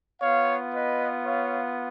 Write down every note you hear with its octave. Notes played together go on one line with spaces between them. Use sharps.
B3 F4 C#5 F5
B4 D#5
C#5 F5